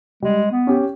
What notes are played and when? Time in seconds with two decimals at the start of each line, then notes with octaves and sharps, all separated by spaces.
0.22 G3 G#3
0.52 B3
0.67 C#4 G4